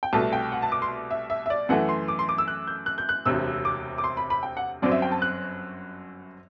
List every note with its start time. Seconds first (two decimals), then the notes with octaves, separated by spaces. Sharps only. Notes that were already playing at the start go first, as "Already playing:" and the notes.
0.03 G5
0.13 C2 B2 A3 A5
0.32 G5
0.52 F#5
0.62 A5
0.72 D6
0.82 C6
1.11 E5
1.30 E5
1.46 E5
1.50 D5
1.69 F#2 E3 A3 F#5
1.89 C6
2.08 D6
2.19 C6
2.29 D6
2.38 E6
2.48 F#6
2.67 G6
2.86 F#6
2.98 G6
3.09 F#6
3.25 E1 D2 C3 E6
3.65 D6
3.98 D6
4.04 C6
4.17 B5
4.30 B5
4.43 G5
4.57 F#5
4.82 G1 F#2 F#3 C4 D5
4.92 E5
5.02 G5
5.11 A5
5.22 F#6